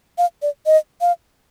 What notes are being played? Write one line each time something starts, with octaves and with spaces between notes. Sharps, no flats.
F5
D5
D#5
F5